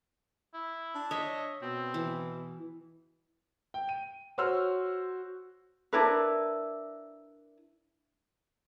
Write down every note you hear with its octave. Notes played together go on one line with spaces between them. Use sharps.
E4
D4
C#5 D#5 E5
B2 C4
E3
G5
D#7
F#4 C5 C#5 C6 E6 F6
D4 E4 A#4 B4